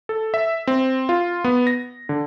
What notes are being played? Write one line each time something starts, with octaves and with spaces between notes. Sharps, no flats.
A4
E5
C4
F4
B3
A#6
D3